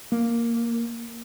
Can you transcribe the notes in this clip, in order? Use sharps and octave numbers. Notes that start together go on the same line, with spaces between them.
A#3